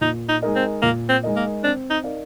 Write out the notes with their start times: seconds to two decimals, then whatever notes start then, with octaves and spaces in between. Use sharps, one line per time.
0.01 A#2 D#4
0.29 D#4
0.42 G#3 D#4 A#4 D#5
0.56 C4
0.82 A#2 A#3
1.09 C4
1.23 G#3 D#4 A#4 D#5
1.36 A#3
1.63 C4 D4
1.90 D#4
2.04 D#4 A#4 D5 F5